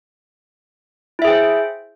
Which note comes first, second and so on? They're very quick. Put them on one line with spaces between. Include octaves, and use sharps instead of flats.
E4 E5 G#4 G5 C5